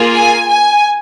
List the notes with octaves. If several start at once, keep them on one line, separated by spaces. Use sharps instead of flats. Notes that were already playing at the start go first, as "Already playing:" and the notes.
Already playing: A#3 F4 G#4
G#5
G#5